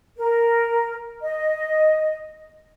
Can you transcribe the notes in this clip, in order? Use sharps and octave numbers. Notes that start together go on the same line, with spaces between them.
A#4
D#5